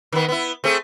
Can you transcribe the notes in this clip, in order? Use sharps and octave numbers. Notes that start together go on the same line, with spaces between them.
D#3 B3
B3 E4
A3 C4 G#4